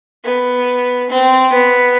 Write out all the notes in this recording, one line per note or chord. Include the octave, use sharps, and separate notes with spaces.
B3
C4
B3